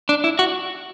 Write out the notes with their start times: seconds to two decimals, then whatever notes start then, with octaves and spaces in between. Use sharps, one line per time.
0.09 D4
0.24 E4
0.39 F#4